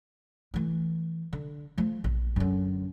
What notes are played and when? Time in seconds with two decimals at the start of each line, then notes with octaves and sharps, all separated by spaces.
0.54 E3 A3
1.33 D3
1.78 F3 A3
2.04 A#1
2.36 F#2 D3